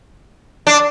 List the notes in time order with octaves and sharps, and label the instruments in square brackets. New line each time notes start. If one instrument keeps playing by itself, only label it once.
[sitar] D4